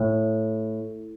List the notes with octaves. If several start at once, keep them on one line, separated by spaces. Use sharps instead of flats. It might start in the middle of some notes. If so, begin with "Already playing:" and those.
Already playing: A2